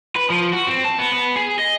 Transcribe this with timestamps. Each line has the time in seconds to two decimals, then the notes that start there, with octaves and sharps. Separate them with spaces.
0.16 B4
0.30 F3
0.53 F#4
0.67 C4
0.84 A5
0.99 B3
1.13 B3
1.36 G#4
1.59 D#5